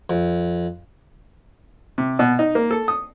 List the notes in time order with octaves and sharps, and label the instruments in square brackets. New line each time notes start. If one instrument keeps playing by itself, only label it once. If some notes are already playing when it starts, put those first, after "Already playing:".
[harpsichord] F2
[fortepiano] C3
B2
D#4
A#3
A4
D#6